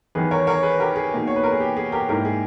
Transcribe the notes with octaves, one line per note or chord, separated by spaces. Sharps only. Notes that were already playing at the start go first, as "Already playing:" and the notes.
E2 D#3 G3 G#4 B4
A#4 C#5
A#4 C#5
G#4 B4
G4 A#4
G#4
B2 A#3 D#4
C#5
B4
A#4
G#4
G4
G#4
G4 A#4
G#2 G3 A#3 E4 G4 A#4
G#4